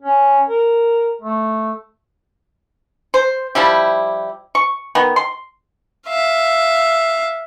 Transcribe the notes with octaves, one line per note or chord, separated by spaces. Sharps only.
C#4
A#4
A3
C5
F3 G3 E4 G4
C#6
D#3 B3
C6
E5 F5